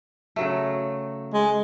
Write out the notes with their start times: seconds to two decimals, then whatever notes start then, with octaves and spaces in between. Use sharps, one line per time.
0.36 C#3 F#3 A3
1.34 G#3